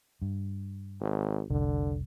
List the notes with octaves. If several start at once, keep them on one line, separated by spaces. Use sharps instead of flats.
G2
G#1
F1 C2 D3